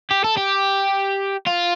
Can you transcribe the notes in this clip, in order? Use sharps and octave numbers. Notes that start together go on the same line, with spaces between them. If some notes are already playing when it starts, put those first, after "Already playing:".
G4
A4
G4
F4